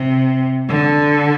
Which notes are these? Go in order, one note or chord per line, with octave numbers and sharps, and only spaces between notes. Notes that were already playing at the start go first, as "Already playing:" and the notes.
Already playing: C3
D3